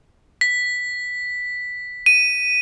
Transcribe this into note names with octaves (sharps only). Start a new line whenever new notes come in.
B6
D#7